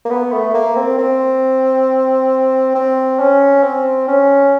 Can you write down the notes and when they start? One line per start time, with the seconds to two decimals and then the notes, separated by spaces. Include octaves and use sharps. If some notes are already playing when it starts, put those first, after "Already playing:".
0.05 A#3
0.10 B3
0.32 A3
0.54 A#3
0.76 C4
0.98 C4
2.75 C4
3.19 C#4
3.64 C4
4.08 C#4